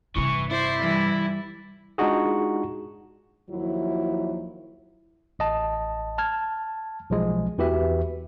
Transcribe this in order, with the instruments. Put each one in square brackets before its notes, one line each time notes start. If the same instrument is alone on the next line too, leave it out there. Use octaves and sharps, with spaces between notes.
[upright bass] G2 C3 [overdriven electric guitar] E3 [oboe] C#6
[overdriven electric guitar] E4 [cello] C5 [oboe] D5
[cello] E3 G3
[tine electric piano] G#3 D4 D#4 F4 F#4 G#4
[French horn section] D#2 F3 F#3 E4
[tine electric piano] A1 D#5 A5
A5 F6 G#6
B1 F3 G#3
E2 E3 F#4 G4 B4 E5